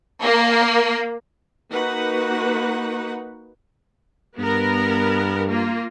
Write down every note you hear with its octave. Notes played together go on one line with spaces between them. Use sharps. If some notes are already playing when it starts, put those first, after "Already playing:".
A#3
A#3 D#4 F#4 B4 F#5
G2 B3 A#4
A#3 F4